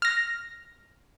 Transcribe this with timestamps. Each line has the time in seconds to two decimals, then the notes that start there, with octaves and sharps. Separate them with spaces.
0.02 F6 A#6